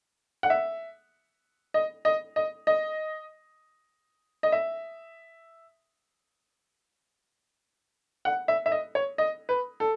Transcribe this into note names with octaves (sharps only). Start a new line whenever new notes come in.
F#5
E5
D#5
D#5
D#5
D#5
D#5
E5
F#5
E5
E5
D#5
C#5
D#5
B4
A4